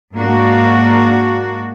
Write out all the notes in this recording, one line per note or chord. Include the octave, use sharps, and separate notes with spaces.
G#2 A#3 D4 F#4